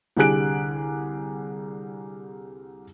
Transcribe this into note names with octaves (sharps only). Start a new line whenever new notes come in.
C2 D3 G4 G#4 F#6 D7